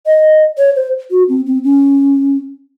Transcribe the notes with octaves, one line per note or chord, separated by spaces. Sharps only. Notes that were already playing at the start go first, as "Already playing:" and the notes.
D#5
C#5
C5
F#4
C4
C4
C#4